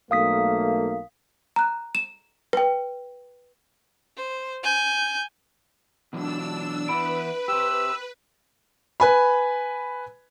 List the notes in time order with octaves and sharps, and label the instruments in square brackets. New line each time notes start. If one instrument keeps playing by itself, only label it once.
[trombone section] B1 A3 A#3 [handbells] F5 D#6 B6
[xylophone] A#5 F#6
E7
B4 G5
[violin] C5
G#5 G6
[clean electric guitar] B2 E3 F#3 [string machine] D4 E6
[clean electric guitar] E3 B3 E4 [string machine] B4 [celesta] B5 D7
[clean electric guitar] G4 C5 [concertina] E6
[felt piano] B4 G#5 B5